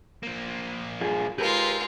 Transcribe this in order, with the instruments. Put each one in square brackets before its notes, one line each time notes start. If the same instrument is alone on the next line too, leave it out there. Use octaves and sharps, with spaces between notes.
[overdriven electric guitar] F3 A#3
[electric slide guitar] G2 F4 G#4
[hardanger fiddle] G#3 F4 [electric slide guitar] G4 A#4 [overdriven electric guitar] B4